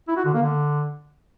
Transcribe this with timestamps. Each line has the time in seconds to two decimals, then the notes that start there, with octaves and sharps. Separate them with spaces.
0.08 E4
0.17 F#4
0.25 D3
0.34 A#3
0.42 D3